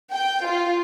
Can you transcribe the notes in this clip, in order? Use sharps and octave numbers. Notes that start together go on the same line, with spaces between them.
G5
F4